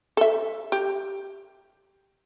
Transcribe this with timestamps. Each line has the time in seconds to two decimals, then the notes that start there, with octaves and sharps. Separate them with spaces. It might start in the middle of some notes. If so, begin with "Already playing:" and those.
0.17 A4 E5
0.72 G4